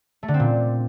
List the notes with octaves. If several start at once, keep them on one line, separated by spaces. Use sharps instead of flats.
A3
D3
C4
A#2